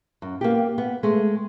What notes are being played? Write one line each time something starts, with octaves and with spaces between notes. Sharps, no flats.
F#2
A#3 B3 G4
B3
G#3 A3